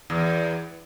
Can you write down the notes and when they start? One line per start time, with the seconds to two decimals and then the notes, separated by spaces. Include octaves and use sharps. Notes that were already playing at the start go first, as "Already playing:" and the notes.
0.10 E2